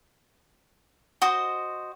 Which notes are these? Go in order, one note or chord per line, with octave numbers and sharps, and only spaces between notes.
F#4 C5 D#5